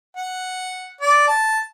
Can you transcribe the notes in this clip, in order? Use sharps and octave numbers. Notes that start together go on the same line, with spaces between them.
F#5
D5
A5